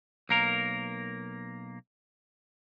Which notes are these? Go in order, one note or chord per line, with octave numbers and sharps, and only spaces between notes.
B1 A#3 A#4